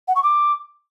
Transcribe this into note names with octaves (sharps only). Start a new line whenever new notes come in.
F#5
C#6
D6